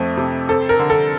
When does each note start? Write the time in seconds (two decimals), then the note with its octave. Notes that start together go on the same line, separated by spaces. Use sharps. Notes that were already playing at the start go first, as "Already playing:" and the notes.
Already playing: F2 F3 A3
0.17 C3
0.49 C4 A4
0.69 A#4
0.79 D3
0.90 A4